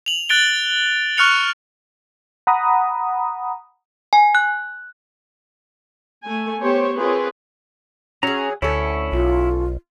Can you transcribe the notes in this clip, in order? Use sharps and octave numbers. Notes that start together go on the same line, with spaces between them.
F7 F#7
F#6 A6 D7 G7
C#6 F6 F#6 C#7 F7
F#5 A#5 B5 D#6
G#5
F#6
A3 G#5
B3 G4 C5 C#5
C4 F4 G#4 A#4 B4 C#5
F#3 C#4 G#4 A#5
D2 C#4 E4 A4 C#5
B1 F4